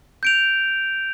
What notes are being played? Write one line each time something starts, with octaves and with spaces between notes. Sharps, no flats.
G6 D7 F7